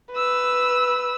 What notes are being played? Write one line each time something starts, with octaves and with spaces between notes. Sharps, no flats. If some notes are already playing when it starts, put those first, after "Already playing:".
B4 E6